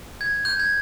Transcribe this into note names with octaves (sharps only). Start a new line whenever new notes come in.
G#6
G6
G#6